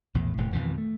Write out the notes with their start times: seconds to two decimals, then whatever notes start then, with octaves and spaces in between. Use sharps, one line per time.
0.14 A#1 E2 A2
0.38 D#1 A2 C3 A3
0.53 G#1 F2 B2 E3
0.78 A3